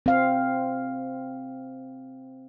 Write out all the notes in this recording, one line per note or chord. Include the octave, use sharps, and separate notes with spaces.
C4 F5